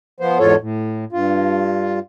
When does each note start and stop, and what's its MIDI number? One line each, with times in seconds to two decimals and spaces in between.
0.20 0.38 53
0.20 0.38 59
0.20 0.38 72
0.39 0.55 40
0.39 0.55 44
0.39 0.55 65
0.39 0.55 69
0.39 0.55 73
0.61 1.05 45
1.12 1.99 43
1.12 1.99 65